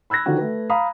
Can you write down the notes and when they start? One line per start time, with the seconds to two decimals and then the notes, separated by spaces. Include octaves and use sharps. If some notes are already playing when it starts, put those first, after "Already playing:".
0.10 B5 E6 F#6 G#6 A#6
0.26 D3 D#3 F3 F#4
0.38 A3 B4
0.70 F5 A#5 B5 D#6